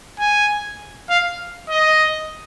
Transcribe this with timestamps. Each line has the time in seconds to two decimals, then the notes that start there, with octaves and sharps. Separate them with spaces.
0.20 G#5
1.10 F5
1.70 D#5